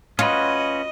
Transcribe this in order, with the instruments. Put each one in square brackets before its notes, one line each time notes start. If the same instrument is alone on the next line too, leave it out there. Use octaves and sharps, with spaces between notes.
[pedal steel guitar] C#4 F#4 B4 [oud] F4 [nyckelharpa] D#5